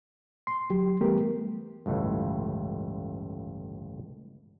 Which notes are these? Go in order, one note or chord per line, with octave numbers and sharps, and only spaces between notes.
C6
D2 F#3 G4
E3 G3 A3 B3 G4 A#4
G1 C#2 A2 E3